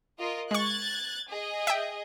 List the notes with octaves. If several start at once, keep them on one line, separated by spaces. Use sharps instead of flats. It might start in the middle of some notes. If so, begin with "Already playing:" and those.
F4 A#4 D#5
G#3 C#6 F#6 G#6 A6
G#4 D#5
E5 G5